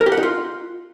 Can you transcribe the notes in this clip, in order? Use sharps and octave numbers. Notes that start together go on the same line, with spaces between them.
A#4
G4
F#5
D#4
F4